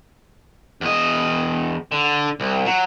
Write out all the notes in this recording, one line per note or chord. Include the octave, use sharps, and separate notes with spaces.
E2 D#5
D3
C2
F#3